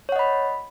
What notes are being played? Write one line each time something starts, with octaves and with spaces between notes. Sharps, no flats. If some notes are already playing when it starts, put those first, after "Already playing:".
C#5 D#5 F#5 B5